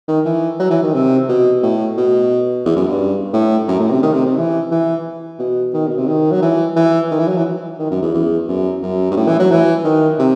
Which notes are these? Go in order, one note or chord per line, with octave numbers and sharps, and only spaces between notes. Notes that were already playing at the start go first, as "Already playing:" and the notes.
D#3
E3
F#3
E3
D#3
C3
B2
A2
B2
E2
F#2
G2
A2
F#2
A2
C3
D#3
C3
C3
E3
E3
B2
D#3
B2
C3
D#3
F#3
E3
E3
D#3
E3
F#3
E3
D#3
F#2
E2
E2
F#2
F#2
G2
A2
E3
F#3
E3
D#3
C3